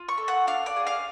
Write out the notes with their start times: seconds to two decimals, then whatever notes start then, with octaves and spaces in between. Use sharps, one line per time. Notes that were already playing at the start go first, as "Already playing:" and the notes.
Already playing: F4
0.08 C#6
0.18 A4
0.28 F#5
0.47 D4 F5
0.66 D5
0.76 G#4
0.87 F5